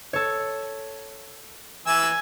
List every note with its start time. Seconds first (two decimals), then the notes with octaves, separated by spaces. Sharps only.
0.13 A4 C#5
1.86 E3 E4 G#5 E6